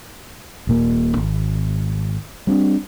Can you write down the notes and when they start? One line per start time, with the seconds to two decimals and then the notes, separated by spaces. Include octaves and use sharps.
0.67 D#1 A#2 A#3
1.17 G#1
2.47 G3 C4 D4